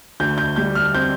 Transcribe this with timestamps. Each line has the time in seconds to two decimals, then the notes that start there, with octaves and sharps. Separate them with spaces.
0.20 D2 G6
0.38 G6
0.56 G3 G6
0.75 F6
0.94 C4 G6